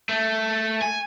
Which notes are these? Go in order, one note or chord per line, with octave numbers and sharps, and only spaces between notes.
A3
G#5